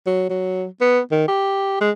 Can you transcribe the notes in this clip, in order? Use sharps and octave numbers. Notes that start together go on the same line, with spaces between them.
F#3
F#3
B3
D#3
G4
G#3